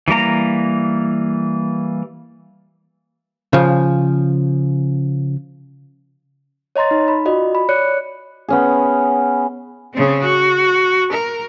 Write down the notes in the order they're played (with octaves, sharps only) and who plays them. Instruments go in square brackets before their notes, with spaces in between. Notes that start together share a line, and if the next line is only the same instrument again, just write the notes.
[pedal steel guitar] E3 G3 A#3 A#5
[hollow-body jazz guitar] C#3 F3
[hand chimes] C#5 D#5 A#5 C6 A6
D#4
B5
F4 F#4 D5 D#5
B5
C#5 D5 F#6 C#7
[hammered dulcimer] B3 C#4 G#4
[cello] C#3 C4
F#4
A#4